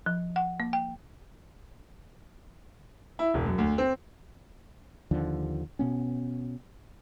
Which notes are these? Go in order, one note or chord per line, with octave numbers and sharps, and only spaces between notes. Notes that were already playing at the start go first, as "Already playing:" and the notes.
F3
F#5
A#3
G5
E4
E1
F#2
D2
C4
D#2 D3 F3
B2 B3 C#4